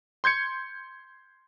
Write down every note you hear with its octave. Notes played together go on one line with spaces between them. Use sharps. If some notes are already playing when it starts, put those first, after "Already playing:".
C6 G6 G#6 C#7